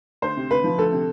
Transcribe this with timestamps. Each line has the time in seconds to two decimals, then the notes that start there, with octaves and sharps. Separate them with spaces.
0.22 D2 C5
0.37 C3
0.50 D2 B4
0.64 F3
0.78 D2 A4
0.92 C3